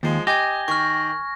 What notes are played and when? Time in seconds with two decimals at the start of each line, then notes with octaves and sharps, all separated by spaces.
0.03 D#2 F3 G#3
0.27 G4 D#5 G#5 G#6 A#6
0.68 D#3 C#6 F6